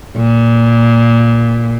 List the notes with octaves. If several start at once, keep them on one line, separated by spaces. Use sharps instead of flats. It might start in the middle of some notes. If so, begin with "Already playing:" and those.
A#2